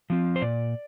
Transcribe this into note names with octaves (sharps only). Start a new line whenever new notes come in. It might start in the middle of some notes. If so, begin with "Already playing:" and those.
F3 C4 F4
C5
A#2 D5